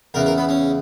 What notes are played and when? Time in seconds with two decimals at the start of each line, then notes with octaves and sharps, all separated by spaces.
0.14 E2 C#3 E3 A#4
0.26 A#4
0.38 B3
0.49 C#4